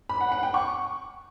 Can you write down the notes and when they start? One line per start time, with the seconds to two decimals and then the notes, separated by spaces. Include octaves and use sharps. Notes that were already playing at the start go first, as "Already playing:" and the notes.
0.09 B5
0.21 F#5
0.32 F#5
0.43 G5
0.54 C#6